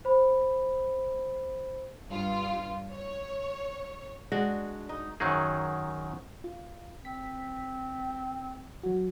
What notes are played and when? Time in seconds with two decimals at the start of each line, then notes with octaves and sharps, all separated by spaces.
0.05 C5 B5
2.10 G2 F4
2.93 C#5
4.32 G#3 D4 F#4
4.89 D#4
5.20 F#2 D#3 F#3 D#4 G#4
6.44 F4
7.05 C4 B6
8.83 F#3 F#4